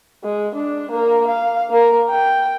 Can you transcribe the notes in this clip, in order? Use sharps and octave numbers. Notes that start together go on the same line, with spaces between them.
G#3
D4
A#3 A#4
F5
A#3 A#4
G5